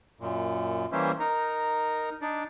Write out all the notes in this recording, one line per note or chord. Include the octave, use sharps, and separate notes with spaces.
F#2 A#2
E3 G3 A#3 C#4 C5 E5
D#4 A#4
D4 D#4 D5